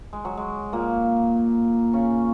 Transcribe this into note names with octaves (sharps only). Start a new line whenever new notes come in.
G#3
F#3
G#3
A#2 A#3
C#3 C#4